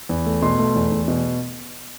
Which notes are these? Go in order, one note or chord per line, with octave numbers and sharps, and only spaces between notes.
E2
A3
B2 C6
A3
E2
E2
B2